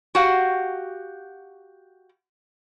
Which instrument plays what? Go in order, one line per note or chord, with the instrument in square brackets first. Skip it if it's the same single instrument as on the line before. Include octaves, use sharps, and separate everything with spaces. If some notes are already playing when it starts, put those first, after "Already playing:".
[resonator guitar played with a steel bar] F#4 G4 F5 F#5